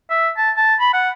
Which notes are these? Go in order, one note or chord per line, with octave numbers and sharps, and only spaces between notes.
E5
A5
A5
B5
F#5